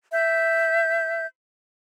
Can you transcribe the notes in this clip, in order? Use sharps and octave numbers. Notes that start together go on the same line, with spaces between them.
E5 G6